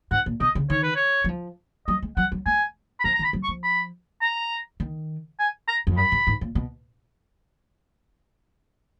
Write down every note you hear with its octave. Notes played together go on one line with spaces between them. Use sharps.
G#2 F#5
A#2
B2 D#5
C#3
D#3 C#5
B4
C#5
F#3
F3
F#3 D#5
G#3
F#3 F#5
F#3
G#3 G#5
B5
F3 A#5
A#5
D#3
B5
F#3
C#6
F3
B5
A#5
D#3
G#5
A#5
F2
F#2 B5
G#2
G#2
A#2
B2